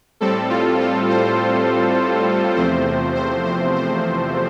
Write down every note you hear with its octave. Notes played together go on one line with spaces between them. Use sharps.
A2 G3 C4 A4
F4
F4
C5
E2 C3 F3 A3 C4 C5
C5
C5
C5